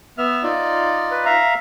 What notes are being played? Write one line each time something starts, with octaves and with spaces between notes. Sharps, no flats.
B3 E5 F6
D#4 F4 D5
B4
E5 F5 A#5